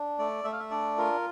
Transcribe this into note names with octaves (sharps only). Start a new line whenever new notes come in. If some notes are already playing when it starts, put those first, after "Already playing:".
Already playing: D4
A3 D5
A3 E5
F5
E5
D4 D5
F4 A#4